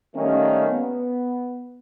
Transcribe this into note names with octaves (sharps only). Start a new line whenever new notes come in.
D#3 G3 A3 A#3 C#4
B3